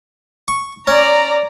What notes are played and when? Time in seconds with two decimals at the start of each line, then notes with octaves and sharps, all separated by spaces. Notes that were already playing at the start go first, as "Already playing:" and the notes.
0.48 C#6
0.87 C#4 D5 A#5